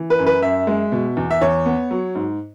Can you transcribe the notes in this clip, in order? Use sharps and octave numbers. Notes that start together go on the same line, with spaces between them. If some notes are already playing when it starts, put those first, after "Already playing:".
Already playing: E3
B4
F#2
B4
F#2 E5
G#3
B2
E2
E5
E2 C#5
B3
F#3
G#2